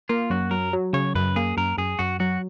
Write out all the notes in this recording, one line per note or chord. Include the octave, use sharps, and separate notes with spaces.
A#3 F4
F#2 F#4
F#3 A#4
F#3
C#3 C#5
F#2 B4
A#3 G#4
F#2 A#4
F#2 G#4
F#2 F#4
F#3 F#4